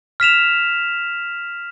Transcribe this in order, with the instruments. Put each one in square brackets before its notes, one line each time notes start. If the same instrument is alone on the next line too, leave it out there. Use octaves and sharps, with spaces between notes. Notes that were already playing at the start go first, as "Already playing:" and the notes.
[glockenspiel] F6 B6 E7 F7